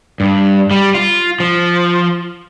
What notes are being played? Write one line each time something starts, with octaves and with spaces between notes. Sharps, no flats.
G2
G3
F4
F3